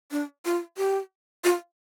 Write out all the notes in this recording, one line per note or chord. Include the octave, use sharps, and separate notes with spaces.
D4
F4
G4
F4